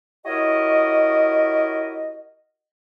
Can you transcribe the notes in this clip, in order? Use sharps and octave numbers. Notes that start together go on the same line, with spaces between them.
E4 F#4 G4 A#4 C#5 D#5